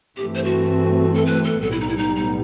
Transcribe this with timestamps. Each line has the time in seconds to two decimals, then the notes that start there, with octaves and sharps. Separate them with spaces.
0.17 G2 E3 A3 C4 G4
0.35 C5
0.45 F#4
1.14 A4
1.26 B4
1.44 A4
1.62 B1 A2 G3 B3 A4
1.72 E4
1.80 D#4
1.89 E4
1.98 D#4
2.16 D#4